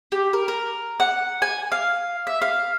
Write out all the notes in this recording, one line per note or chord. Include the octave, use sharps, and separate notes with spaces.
G4
A#4
A#4
F#5
G#5
F5
E5
F5